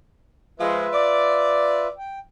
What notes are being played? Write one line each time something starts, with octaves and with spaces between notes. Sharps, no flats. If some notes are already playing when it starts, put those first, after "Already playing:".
F3 G#3 F4 B4 E5
D5
G5